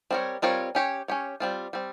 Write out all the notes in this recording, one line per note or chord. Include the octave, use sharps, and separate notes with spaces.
G3 C4 F4 A#4 C#5
G3 C4 F4 A#4 C#5
C#4 G4 C#5
C#4 G4 C#5
G3 C4 F4
G3 C4